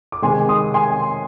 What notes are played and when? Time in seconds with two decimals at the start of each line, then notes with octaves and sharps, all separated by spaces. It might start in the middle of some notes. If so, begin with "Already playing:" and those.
0.12 D6
0.22 C3 D#3 G#3 C4 G#5 C6
0.49 C6 D#6
0.74 G#5 C6